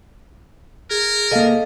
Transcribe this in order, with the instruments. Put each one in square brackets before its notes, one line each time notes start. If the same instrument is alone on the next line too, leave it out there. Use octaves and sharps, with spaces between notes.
[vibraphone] G#4 [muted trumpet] A#4
[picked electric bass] C2 A#3 [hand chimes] A4 D#5 F5